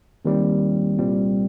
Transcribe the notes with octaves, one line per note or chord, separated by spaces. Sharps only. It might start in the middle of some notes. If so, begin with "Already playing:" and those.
D#2 D#3 G3 C4
C2 A#2 G3 C4